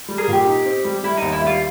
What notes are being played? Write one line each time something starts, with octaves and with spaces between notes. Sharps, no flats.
G3
G#4 A#4
A#2 G4
D#4
C4
G3
G3 E4
D#2 D#4
E4
G3
F4